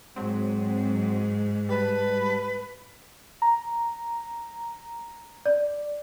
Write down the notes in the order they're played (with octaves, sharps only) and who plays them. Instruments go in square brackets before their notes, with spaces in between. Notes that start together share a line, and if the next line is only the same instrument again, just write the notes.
[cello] G#2 [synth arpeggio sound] F#3 C4
[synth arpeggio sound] G3 A5 [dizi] B4
[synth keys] A#5
[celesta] D5